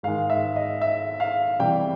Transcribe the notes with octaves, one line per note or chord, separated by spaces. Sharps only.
G#2 D#3 G#3 F5
E5
D#5
E5
F5
C3 E3 G3 G5